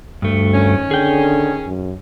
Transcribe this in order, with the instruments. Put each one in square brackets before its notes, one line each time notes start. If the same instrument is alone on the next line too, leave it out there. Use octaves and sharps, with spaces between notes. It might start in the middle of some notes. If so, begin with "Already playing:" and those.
[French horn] D2 [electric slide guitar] G2 A3
[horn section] D#3 C#4
[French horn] D3 [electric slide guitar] G#4 G5
[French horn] F#2